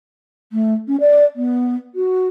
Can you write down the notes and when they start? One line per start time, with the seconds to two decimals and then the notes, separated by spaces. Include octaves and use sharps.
0.52 A3
0.88 C#4
1.00 D5
1.36 B3
1.95 F#4